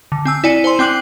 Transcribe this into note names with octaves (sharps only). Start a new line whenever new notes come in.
D3
C4 G#5 E6
E4 D5 G#5 C#7 D#7
C5 G#5 C6
C4 G5 D6 F#6 C7 F#7